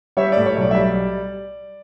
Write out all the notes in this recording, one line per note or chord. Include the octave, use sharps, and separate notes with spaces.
G3 C#5 E5
A2 D5
C#5
B1
D5
E5
G3 D5